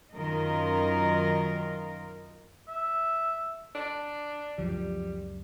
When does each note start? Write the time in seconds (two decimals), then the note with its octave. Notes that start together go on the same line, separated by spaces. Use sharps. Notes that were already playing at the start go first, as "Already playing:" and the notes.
0.14 F#2 D#3 F4 A#4 D#5
2.68 E5
3.75 D4
4.58 C#2 F#2 F3 G3